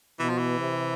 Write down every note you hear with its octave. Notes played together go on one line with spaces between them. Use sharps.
B2 E3
F3
E3
C3